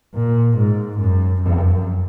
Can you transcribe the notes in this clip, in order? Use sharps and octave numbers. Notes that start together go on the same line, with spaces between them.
A#2
G#2
F#2
F#2